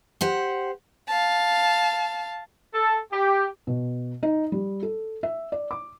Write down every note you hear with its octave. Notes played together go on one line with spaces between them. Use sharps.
G4 C5 F#5
F5 A5
A4
G4
B2
D#4
G3
A4
E5
D5
D6